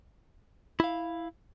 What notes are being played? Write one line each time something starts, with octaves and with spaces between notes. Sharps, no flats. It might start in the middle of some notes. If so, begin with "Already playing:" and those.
E4 F5